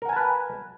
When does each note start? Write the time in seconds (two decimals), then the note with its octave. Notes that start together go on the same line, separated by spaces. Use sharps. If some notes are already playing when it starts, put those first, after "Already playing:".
0.02 A#4
0.05 F#5
0.09 G#5
0.13 A5
0.16 B4